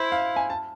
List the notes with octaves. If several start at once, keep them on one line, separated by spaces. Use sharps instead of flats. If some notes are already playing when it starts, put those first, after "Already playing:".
Already playing: E4 C5
F5
G#5
A5